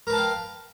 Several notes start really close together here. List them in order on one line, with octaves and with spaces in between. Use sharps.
A#4 B4 A5 F5 G5